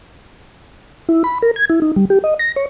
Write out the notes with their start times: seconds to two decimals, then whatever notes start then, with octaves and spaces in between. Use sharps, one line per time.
1.09 E4
1.24 B5
1.42 A#4
1.56 G#6
1.69 E4
1.82 D#4
1.96 G3
2.10 G4
2.24 D#5
2.39 A#6
2.56 C#5